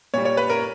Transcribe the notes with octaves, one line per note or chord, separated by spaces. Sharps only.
A#2 G3 C#5
C#5
B4
A#4